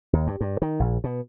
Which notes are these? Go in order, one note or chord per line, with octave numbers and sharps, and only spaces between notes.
D#2
G2
G2
D#3
A#1
B2